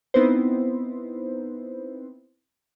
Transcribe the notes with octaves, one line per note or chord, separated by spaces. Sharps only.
B3 C4 D#4 E4 B4 C5